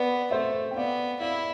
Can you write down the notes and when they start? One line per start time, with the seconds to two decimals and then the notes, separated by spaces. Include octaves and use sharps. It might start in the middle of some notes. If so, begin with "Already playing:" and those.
Already playing: B3 B4 D5
0.31 A3 C5 E5
0.71 G5
0.76 B3 D5 F5
1.21 E4 D5 F5